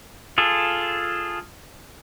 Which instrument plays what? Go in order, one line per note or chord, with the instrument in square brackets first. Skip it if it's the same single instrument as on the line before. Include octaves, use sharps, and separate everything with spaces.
[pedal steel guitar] F4 G#4 A4